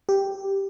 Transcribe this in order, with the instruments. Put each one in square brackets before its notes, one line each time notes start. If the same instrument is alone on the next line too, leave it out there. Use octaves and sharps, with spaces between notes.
[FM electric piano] G4